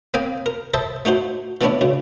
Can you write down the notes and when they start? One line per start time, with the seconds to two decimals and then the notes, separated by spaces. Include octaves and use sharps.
0.14 A#3 C4 D#5 G5 G#5
0.46 A#4
0.74 A4 C5 D#5 E5 A5
1.05 A3 D#4 F#4 C5
1.61 E3 A3 B3 C#4 D4 E4
1.81 D2 C#3